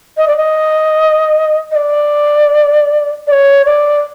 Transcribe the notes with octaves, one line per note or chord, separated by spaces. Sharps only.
D#5
D5
D#5
D#5
D5
D5
C#5
D5